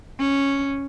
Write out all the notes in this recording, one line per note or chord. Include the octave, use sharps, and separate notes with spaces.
C#4